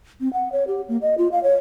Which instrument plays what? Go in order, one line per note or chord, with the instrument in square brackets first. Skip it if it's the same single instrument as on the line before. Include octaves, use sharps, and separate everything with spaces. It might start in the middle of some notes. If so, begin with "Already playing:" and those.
[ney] C4
F#5
C#5
G4
A#3
D#5
F4
F5
C#5